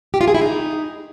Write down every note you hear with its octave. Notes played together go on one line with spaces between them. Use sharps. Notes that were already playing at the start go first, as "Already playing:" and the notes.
G4
F4
G#4
E4
D#4